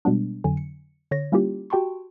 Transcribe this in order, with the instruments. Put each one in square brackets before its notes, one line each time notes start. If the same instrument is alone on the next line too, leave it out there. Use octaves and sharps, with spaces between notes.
[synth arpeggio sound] B2 G3 G#3 B3 D4
F2 D3 F#3 G#5
C#7
D3 C#5 A#6
G3 A#3 C#4 E4 F4 G4
F#4 G4 G5 A5 C6 C#6